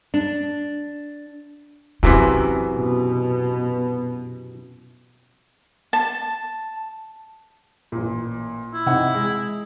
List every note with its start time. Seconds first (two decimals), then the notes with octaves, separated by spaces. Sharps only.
0.14 D4
2.03 F#2 C3 E3 C4
2.75 B2
5.93 A5
7.92 A1 A#2
8.73 E4
8.86 C3 D#4 F#5
9.14 G#3